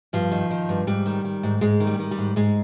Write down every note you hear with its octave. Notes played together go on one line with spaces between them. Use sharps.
G2 F3
D#3
D#3
G2
G#2 G3
D#3
D#3
G#2
G#2 G#3
D#3
G3
D#3
G3
G#2
G#2 G#3